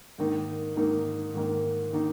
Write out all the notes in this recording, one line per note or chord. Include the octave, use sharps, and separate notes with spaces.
G#2 D#3 A#3 D#4
G#2 D#3 A#3 D#4
G#2 D#3 A#3 D#4
D#3 A#3 D#4